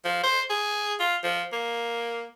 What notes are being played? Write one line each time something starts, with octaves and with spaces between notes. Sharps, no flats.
F3
C5
G#4
F4
F3
A#3